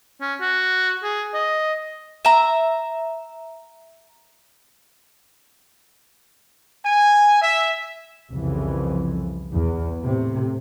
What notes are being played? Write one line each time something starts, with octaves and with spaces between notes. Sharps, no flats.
C#4
F#4
G#4
D#5
E5 A#5
G#5
E5
C2 F2 C#3 E3
E2
A2 C3